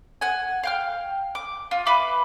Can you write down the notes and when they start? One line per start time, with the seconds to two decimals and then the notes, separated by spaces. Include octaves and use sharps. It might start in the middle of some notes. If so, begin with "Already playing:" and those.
0.21 F#5 G#5
0.63 F5 G5 F6
1.35 D6
1.71 F4
1.86 B4 E5 B5 D6